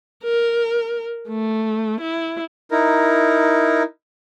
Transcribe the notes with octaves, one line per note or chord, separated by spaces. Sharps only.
A#4
A3
E4
D#4 E4 A#4